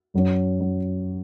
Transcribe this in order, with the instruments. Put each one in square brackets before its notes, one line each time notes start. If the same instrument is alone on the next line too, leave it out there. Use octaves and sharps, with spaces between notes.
[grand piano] F#2 F#3 C#4
F#3 C#4